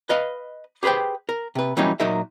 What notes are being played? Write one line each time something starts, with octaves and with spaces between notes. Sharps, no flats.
B4 D#5 F5 B5
G4 G#4 B4 C5 G5
A#4
C3 B4
E3 F#3 G3 A#3 C#4 D#4
A#2 F#3 D#4 A#4 E5